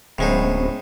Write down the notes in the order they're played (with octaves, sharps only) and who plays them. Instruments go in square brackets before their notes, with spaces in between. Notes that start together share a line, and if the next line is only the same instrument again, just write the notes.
[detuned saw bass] D1 [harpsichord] A2 G#3 D#4 [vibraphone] B3 C#4 C5